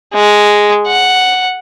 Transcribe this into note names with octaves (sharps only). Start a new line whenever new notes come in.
G#3
F#5